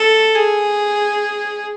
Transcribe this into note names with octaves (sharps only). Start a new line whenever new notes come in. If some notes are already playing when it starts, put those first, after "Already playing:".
Already playing: A4
G#4